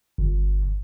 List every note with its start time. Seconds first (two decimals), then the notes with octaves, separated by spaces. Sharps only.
0.18 G1